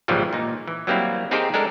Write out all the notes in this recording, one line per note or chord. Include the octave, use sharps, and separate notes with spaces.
A#1 G#2 C#3 E3 F3 G3
A#2 D#4
E3
F#3 G3 A#3 C4 E4
C4 D#4 G4 G#4 A#4 C5
G#3 D4 A4 A#4